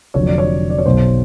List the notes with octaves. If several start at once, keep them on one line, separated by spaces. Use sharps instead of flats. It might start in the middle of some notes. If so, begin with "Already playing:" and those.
F1 F2 D3 F#3 C#5
D5
C#5
D5
C#5
B1 B2 F#3 C5